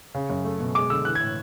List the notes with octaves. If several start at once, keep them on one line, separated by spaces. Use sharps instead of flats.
C#3
F#2
A3
B2
G#3 D6
D3 E6
E3 F#6
A2 G#6